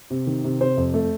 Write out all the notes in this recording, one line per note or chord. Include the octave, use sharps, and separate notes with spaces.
C3
D#3
C3
C3 C5
F2
A3